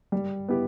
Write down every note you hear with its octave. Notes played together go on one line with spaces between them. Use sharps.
G3
B3 E4 G4